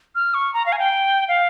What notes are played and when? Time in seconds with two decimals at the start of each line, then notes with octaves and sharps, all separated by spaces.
0.15 F6
0.34 C#6
0.54 A#5
0.66 F5
0.72 G#5
0.79 G5
1.28 F5